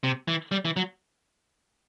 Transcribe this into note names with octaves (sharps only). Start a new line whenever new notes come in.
C3
E3
G3
E3
F#3